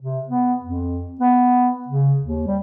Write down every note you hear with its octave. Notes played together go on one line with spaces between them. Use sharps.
C3
B3
F2
B3
C#3
D#2
G3